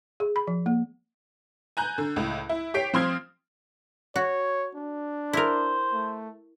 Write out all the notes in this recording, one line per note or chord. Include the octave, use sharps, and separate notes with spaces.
G#4
B5
F3
A#3
G#5 A#5 F#6 G6
D3
C#2 A2
E4
G4 C#5 G5 B6 C7 D7
F3 C4 C6 D#6 F6 G#6
F#4 C#5
D4
E4 A#4 C5
A3